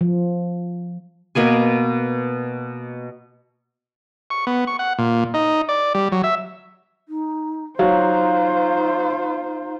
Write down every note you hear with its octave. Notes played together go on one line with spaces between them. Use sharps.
F3
B2 A#3 B3 G#5
C#6
B3
C#6
F#5
A#2
D#4
D5
G3
F#3
E5
D#4
F#3 D#4 F4 C5 F5